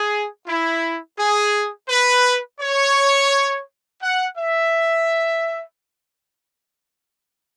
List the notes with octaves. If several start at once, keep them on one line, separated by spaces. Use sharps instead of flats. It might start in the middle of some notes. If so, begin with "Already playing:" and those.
Already playing: G#4
E4
G#4
B4
C#5
F#5
E5